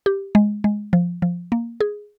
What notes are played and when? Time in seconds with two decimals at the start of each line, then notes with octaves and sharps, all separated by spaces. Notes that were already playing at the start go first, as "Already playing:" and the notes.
0.06 G4
0.35 G#3
0.64 G#3
0.93 F3
1.22 F3
1.52 A#3
1.81 G#4